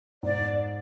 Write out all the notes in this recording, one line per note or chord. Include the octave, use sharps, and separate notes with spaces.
G#2 D5